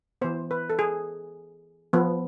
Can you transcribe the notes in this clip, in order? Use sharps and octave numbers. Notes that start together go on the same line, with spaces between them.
E3 B3 C5
B4
A4
G#4
F3 B3